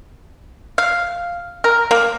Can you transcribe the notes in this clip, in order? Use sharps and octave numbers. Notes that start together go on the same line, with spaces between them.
F5
A#4
A#3